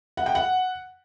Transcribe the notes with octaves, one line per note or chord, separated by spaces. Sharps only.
F#5
G5
F#5